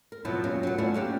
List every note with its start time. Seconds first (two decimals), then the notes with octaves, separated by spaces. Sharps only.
0.12 A#4
0.25 B2 F3 F#3 B3 C4 E4
0.44 F#2 F#3 G3 A#3 C#4
0.63 F#3 B3
0.78 A3 C#4 E4 F4 D5 F#5
0.94 A#3 C#4 D4 G4